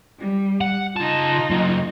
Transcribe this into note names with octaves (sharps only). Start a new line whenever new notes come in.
G3
F#5
C#3 D#4 F4 A5
C#3 F#3